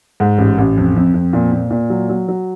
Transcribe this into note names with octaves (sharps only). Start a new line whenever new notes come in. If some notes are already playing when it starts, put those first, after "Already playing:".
G#2
A1
A1
F2
F2
F2
A#2
A#2
A#2
F#3
F#3
F#3